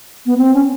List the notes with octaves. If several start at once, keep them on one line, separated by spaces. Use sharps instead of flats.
B3
C4
C#4